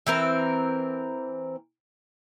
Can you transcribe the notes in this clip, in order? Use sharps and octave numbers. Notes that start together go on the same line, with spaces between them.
E3 C4 A#4